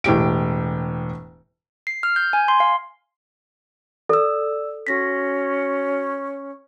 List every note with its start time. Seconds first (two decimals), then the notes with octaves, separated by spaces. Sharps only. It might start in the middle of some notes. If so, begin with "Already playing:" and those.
0.04 E1 A2 G4 D7
1.87 C7
2.03 F6
2.16 G6
2.33 G#5
2.48 C6
2.60 F5
4.09 A4 D5 E6
4.87 C#4 F#4 A#6 B6